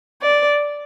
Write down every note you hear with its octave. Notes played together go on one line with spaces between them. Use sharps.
D5